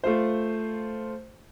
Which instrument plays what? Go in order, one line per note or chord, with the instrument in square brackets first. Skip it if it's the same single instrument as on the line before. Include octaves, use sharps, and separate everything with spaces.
[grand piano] A3 F4 C5